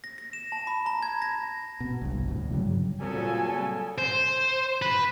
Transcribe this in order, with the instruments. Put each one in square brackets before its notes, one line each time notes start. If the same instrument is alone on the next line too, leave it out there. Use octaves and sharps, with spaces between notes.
[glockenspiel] A#6
A#6
E7
A5
B5
A#5
G#6
A#6
[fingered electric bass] B2
G1 C2 G2
D2 A2
G2 C#3 F#3 G3
[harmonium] A#2 [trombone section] C#3 F#3 A4 [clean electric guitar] G3 C4 [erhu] G#5
[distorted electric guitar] C5
B4